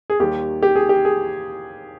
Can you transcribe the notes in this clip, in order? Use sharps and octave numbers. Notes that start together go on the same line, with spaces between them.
G#4
D#2 D#3 G3 G4
G4
G#4
G4
G#4